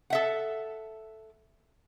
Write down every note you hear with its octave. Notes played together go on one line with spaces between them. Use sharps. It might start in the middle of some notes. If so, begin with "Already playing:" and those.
A4 E5 F#5